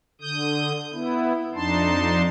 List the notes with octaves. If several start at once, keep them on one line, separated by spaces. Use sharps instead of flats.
D3 D#6 G6
B3 E4
F2 D4 D#4 A5 C6